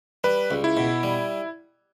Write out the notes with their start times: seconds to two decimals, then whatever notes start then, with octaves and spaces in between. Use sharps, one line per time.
0.24 G3 B4
0.51 C#2
0.64 E4
0.77 B2
1.03 G3